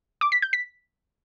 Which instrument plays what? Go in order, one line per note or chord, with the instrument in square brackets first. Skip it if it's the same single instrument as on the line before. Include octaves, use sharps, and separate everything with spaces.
[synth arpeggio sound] D6
B6
G6
B6